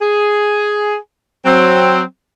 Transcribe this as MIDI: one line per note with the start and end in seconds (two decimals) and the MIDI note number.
0.01 0.95 68
1.45 2.01 54
1.45 2.01 60